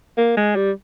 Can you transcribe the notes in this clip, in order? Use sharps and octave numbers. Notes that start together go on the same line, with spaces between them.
A#3
G#3
G3